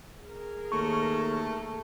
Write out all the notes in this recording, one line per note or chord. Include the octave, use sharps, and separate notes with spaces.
G#4 A#4
D#2 A3 C#6